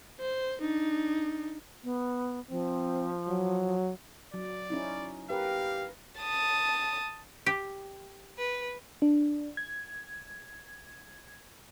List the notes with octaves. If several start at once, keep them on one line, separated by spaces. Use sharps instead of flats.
C5
D4 D#4
B3
F3 C4
F#3
F#3 D5
C#4 D#4 E4
G4 A#4 B4 F5
A5 D#6
G4
B4
D4
G#6